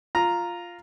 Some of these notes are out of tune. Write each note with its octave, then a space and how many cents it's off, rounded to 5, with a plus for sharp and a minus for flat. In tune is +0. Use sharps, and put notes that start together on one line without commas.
F4 +0 A#5 +0